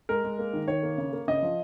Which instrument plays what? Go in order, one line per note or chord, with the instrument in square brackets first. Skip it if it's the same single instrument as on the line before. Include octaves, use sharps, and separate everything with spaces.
[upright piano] G#3 A#4
G#3
A#3
D#3
D#3 C#5
A#3
C#3
A#3
C#3 D#5
F3